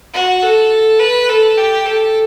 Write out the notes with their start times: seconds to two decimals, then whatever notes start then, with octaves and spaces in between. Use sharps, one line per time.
0.14 F#4
0.43 A4
0.99 B4
1.29 A4
1.57 G4
1.86 A4